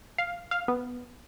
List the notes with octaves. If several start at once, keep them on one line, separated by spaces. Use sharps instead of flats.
F5
F5
B3